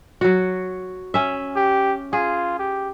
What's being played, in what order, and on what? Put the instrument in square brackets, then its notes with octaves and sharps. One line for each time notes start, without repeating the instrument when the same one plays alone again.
[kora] F#3 F#4
C#4 E5
[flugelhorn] G4
[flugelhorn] F4 [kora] G#4
[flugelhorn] G4